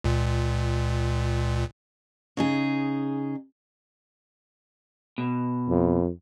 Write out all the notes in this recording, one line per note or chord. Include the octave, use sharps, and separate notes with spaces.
C#2 A#2
C#3 D#4 G#4
B2
F2